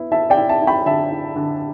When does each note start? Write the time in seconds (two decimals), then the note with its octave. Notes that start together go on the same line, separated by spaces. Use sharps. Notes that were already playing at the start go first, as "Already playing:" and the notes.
Already playing: B3 E4
0.12 E4 E5 A5
0.30 D5 G5
0.37 E4
0.49 E5 A5
0.62 E4
0.67 G5 B5
0.86 D3 E5 A5
1.11 E4
1.36 D3